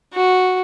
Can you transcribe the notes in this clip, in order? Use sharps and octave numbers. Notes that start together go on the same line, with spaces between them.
F#4